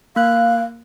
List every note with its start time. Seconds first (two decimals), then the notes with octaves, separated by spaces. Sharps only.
0.16 A#3 F5 F#6